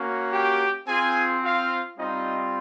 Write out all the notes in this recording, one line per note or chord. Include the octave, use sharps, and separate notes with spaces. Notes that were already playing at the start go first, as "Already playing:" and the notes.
Already playing: A#3 C#4 F#4
G4 G5
C4 F4 G#4 G#5
F4 F5
G3 C4 D#4 F4 D#5